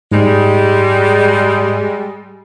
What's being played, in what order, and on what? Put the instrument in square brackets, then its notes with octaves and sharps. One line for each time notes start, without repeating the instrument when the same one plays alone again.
[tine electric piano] G#2 [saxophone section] G3 G#3